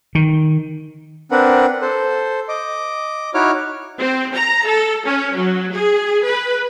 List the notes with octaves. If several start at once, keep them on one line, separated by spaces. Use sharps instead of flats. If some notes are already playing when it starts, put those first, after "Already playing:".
D#3
C4 D4 A#4 B4 F#5
A4 C5
D#5 D6
D#4 E4 F#4 C#5 D6 F6
C4
A#5
A4
C#4
F#3
G#4
B4